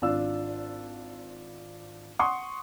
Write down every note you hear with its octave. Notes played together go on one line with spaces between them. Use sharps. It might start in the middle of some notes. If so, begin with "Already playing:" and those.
G#1 D4 F4 E6
F#5 C6 C#6 D#6